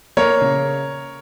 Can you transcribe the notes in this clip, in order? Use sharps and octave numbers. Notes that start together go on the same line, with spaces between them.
A#3 A#4 C#5
C#3